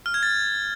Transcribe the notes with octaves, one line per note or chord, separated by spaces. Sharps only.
F6
G#6
A6